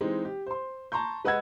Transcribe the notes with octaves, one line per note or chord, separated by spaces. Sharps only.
E3 G#3 C4 D#4
G4
C5 C6
A5 A#5 C6 C#6 G6
G#3 B4 D#5 F#5 E6 G#6